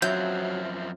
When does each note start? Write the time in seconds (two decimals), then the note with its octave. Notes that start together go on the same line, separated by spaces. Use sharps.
0.02 F#2 F3 F#3 C4 E5 G6